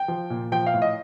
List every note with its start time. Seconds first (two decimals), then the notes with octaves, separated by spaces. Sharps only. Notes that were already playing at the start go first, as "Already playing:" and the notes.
Already playing: G5
0.08 F3
0.30 A#2
0.52 F3 G5
0.67 F5
0.74 A2
0.82 D#5